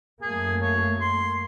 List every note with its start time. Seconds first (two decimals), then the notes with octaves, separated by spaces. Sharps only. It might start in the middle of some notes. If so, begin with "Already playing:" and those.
0.22 F#2 A3 A#3 G#4
0.62 C#5
1.01 C6